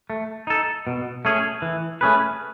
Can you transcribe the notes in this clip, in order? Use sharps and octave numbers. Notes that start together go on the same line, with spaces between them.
A3
D#4 A4
B2
A3 C#4 G#4
E3
A3 C#4 G#4 B4